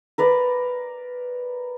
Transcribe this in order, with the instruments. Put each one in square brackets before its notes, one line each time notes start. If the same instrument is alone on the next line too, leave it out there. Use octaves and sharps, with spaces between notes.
[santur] A#4 B4 D5